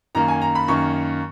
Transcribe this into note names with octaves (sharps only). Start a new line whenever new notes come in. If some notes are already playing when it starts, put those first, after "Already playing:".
F#2 D#3 A#3 A#5
G#5
A#5
B5
F#2 D#3 A#3 C#6